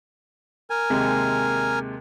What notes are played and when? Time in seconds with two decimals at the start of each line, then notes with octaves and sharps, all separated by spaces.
0.70 A#4 G#5
0.90 D#2 C3 G#3